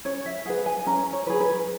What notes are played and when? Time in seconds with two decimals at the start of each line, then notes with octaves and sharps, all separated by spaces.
0.05 C#4 C#5
0.26 E5
0.46 G#4 F#5
0.49 B4
0.66 G#5
0.87 C#4 A#5
1.13 C#5
1.27 G#4 B4
1.40 B4